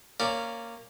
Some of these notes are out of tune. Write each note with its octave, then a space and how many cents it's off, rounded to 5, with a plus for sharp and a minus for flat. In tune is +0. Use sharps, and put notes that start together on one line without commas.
A#3 -10 C#4 +0 D5 +0